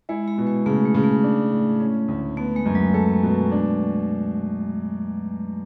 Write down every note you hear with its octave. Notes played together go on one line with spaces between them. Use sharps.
G#3 E4
G#3
B2
G#3
C#3 A3
G#3
C#3
A3
D4
A2
C#4
D2
A3 B3
G#3
F#2
F#3
G#3 A4
B2
D4